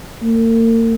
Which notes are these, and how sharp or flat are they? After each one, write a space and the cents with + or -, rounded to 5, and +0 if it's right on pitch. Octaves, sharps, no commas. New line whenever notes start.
A#3 -40